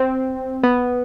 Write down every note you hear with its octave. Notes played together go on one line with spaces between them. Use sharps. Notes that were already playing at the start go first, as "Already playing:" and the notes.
Already playing: C4
B3